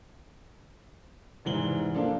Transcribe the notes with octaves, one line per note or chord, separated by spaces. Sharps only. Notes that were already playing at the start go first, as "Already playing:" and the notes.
F1 G#2 E3 F#7 G7
F3 A#3 D4 A4